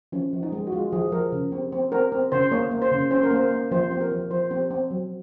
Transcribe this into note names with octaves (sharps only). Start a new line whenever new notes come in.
F3 C#4
F3
D#4
G#3
F#4
G#3 F4
F3 G#4
F3 A#4
C#3
C4
C4
C4 A#4
C4
C#3 C5
A#3 C#5
A#3
C5
C#3
C#4 C5
A#4
A#3 C5
A#3
F3 C5
C4
A#4
F3
F3 C5
C4
C4
F#3